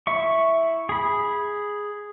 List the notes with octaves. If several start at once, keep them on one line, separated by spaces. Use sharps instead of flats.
E4 E5 C#6
G#4 B5